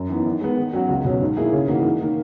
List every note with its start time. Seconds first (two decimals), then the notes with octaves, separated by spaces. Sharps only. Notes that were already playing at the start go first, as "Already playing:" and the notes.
Already playing: F#2
0.09 E3 B3 D#4
0.25 D#3
0.41 G#3 B3
0.57 D#3
0.73 F#3 C#4 F#4
0.89 C#2
1.05 B2 F#3 C#4
1.21 G#2
1.37 D#3 A#3 E4 G#4
1.53 C#3
1.68 E3 A#3 D#4 F#4
1.84 G#2
2.01 D#3 A#3